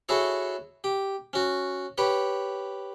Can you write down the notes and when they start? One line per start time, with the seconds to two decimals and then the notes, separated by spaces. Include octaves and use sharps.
0.09 E4 F#4 G#4 A4 C#5
0.84 G4
1.33 C#4 F#4
1.98 G4 B4 C#5